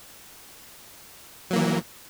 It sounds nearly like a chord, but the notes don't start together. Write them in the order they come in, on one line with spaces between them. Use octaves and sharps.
F#3 A#3 E3